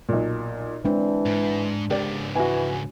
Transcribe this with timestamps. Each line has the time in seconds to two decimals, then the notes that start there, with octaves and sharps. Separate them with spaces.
0.09 B1 A#2
0.85 E3 G#3 C4 D4
1.26 G#2
1.90 C#2 G#2 G4 A#4 D5
2.35 E3 F#4 G#5